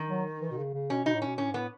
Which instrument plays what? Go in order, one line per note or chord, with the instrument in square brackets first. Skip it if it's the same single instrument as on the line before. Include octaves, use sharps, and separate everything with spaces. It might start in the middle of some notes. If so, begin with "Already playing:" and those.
Already playing: [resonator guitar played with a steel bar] D#3
[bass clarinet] F#3
E3
B2
C#3
C#3
[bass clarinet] B2 [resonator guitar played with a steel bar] C#4
[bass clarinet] B2 [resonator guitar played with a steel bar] D#4
[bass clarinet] A2
[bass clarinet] B2 [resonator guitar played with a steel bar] C#4
[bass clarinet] A2 [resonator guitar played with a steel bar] C#4
[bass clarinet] G#2
[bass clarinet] A2 [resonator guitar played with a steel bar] B3